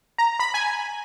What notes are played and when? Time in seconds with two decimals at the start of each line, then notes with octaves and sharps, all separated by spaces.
0.18 A#5
0.40 B5
0.54 G#5